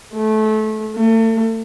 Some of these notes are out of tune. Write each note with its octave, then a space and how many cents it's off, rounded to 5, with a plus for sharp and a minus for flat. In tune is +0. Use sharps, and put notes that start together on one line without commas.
A3 -25
A3 +35